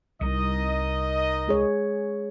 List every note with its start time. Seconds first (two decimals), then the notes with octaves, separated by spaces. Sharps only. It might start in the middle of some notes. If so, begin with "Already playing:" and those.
0.21 C2 G3 D#4 A#4 D#5
1.47 G#3 G#4 C#5